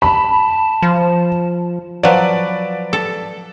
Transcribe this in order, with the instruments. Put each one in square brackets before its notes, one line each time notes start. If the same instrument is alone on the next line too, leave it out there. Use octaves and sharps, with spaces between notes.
[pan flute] A5 [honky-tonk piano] B5
[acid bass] F3
[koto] F3 F#3 [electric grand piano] B4 D5
[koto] A4